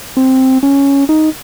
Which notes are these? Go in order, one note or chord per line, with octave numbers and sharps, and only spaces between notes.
C4
C#4
D#4